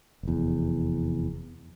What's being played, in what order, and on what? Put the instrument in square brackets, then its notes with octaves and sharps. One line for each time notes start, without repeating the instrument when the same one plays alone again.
[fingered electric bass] F1 E2